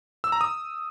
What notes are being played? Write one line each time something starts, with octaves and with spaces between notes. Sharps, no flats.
E6
A#5
D#6